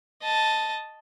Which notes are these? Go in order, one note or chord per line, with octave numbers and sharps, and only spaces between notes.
D#5 A5